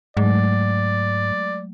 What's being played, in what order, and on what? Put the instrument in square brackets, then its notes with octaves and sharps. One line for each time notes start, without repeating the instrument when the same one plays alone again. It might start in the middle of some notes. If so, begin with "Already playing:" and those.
[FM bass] G#2 [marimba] F#3 G#3 A3 [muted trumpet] D5